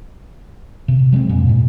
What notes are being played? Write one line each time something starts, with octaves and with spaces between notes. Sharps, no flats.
C3
F#3 G#3 B3 C4
F2 A#2
G#2 B2